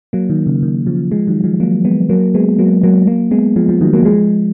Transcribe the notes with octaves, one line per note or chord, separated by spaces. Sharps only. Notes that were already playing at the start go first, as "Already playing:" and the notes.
F#3 A#3
D#3
C#3
D#3
C#3 F3
F3 G#3
D#3 F#3
F3 G#3
F#3 A#3
G#3 B3
F#3 A#3
G#3 B3
F#3 A#3
F#3 A#3
F#3 A#3
G#3 B3
F3 G#3
F3 G#3
D#3 F#3
F#3 A#3
F3 G#3